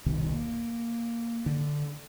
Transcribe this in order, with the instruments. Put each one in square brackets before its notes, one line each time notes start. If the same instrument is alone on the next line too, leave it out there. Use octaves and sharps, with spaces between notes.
[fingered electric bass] E1 C2 B2 D#3
A#3
D3